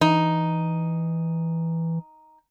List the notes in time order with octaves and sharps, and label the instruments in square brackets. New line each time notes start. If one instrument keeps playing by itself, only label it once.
[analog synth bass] E3 [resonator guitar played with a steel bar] D#4